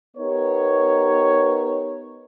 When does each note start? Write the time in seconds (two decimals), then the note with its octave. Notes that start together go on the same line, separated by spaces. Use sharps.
0.17 B3 D#4 G4 A#4 B4 C#5